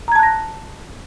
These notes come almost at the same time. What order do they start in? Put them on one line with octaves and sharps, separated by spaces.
A#5 G#6 A5 F#6 A#6